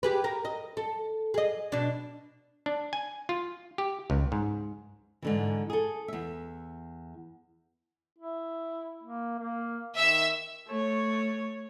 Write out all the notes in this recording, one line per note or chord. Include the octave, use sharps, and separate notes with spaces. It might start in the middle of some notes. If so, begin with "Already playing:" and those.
G4 G#4 B4
A#4
D#5
A4
G#4 D#5
B2 D4
D4
G#5
F4
G4
C#2
G#2
G#2 D3 E3
G#4 A4
E2 E5
E4
A#3
A#3
D#3 E5 E6
A3 C#5